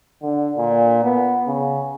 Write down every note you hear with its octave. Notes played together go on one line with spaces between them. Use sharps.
D3
A#2
B3
C#3